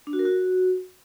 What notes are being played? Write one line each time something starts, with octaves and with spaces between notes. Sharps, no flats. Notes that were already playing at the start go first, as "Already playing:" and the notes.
D4
F#4
A#4
F#4